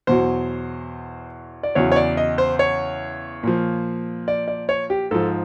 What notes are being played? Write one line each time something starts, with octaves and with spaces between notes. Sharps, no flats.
E2 B2 F#3 C5
D5
E2 C#3 F#3 C#5
C#5
D5
D#5
C5
C#5
A#2 F3
D5
D5
C#5
G4
G#2 F3 A4